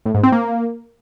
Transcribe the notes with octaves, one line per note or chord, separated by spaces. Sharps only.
A2
G#2
C4
A#3